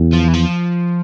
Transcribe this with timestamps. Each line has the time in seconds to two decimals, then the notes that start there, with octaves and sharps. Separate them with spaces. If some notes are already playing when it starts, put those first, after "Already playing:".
Already playing: E2
0.13 F3
0.28 E3
0.34 F3